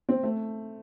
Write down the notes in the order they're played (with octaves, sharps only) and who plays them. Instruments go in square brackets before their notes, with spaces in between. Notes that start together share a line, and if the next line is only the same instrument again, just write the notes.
[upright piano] C4
A3